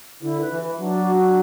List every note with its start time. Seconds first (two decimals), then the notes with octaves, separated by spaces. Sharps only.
0.22 D3 E4
0.41 B4
0.51 E3
0.60 E4
0.79 F#3 D4
0.97 F#4
1.16 D4